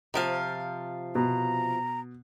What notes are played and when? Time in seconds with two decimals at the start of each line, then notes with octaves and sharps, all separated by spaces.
0.14 C3 F3 F5
1.15 B2 A#5